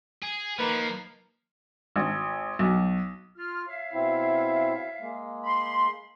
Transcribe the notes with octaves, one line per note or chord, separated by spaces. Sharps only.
G#4
F3 A#3 D#4 A#4 B4
G#1
B1
F4 F6
C#5 E5 F5
B2 C4 E4
G#3 A#3
B5 C6